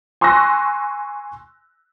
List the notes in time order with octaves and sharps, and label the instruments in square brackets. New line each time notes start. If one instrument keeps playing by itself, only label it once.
[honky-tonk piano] G#5 C6 C#6 E6 F#6 A#6